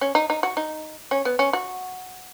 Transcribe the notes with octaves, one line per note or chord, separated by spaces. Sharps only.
C#4
D#4
D#4
F#4
D#4
C#4
B3
C#4
F#4